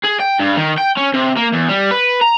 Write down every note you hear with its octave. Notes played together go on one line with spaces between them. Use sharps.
G#4
G5
G2
D#3
G5
C#4
C3
A#3
E2
G3
B4
A#5